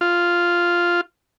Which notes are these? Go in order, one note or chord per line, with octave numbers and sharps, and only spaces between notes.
F4